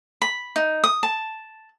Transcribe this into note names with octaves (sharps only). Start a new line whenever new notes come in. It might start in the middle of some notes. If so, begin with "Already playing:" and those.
B5
D#4
D#6
A5